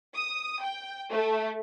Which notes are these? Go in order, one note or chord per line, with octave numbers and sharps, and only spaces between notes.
D#6
G5
A3